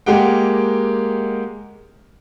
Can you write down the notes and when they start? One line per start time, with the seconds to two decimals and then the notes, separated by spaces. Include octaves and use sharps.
0.06 G#3 A#3 G4 A#4 F#5 G5